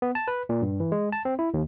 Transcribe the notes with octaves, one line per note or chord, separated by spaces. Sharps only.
B3
A5
B4
A#2
G2
E3
G#3
A5
C4
E4
D#2